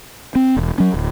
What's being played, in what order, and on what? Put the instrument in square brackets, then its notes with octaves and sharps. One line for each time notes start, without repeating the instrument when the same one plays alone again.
[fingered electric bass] C4
E1
F#3 C#4
D1